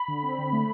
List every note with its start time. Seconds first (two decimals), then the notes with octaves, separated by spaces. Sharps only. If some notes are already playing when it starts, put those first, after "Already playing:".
Already playing: B5
0.08 D3
0.23 C4
0.38 D3
0.53 A3